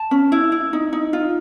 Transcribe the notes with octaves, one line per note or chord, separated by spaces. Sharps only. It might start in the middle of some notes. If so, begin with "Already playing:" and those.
Already playing: A5
C#4
E4
E4
D#4
D#4
F4